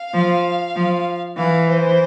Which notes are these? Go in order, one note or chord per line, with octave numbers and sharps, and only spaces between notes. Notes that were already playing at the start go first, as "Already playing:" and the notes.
Already playing: F5
F3
F3
E3 F5
C5